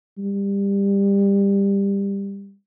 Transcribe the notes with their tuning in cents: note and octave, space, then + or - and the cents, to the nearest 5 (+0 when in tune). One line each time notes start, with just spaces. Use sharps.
G3 +20